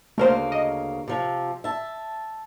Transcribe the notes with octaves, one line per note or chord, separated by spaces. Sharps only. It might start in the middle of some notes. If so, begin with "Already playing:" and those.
D2 C#3 A3 A#3 A#4 C5
D#5
C3 F3
E5 A5